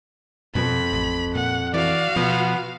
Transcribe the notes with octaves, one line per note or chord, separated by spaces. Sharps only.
F2 B2 B5
A1
A#2 F#5
E3 F#4 D5 F5
B2 F3 B3